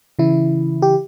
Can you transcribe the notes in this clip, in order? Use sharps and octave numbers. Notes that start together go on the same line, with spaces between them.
C#3 E3 E4
G4